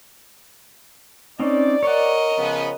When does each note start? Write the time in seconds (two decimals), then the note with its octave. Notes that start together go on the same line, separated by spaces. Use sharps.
1.40 C4 C#4 D#4 D5
1.83 A#4 C#5 D#5 F#5
2.38 C#3 F3 B3